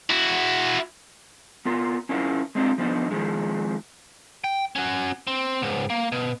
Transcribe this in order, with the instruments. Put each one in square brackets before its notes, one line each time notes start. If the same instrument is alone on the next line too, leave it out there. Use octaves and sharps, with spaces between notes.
[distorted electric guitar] E4 F#4
[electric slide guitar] B3 F4 A#4
C#4 E4 F4 A#4 C#5
G#3 C4 D4 D#4 F4
F3 B3 D4 D#4
D#3 F3 G#3
[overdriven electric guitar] G5
C#4 F#4
C4
C#2 G#2
A#3
B2